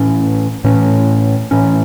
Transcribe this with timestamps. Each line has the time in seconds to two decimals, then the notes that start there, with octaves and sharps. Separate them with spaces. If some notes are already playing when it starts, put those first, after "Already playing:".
Already playing: A2 E3 C#4
0.64 A2 E3 C#4
1.51 A2 E3 C#4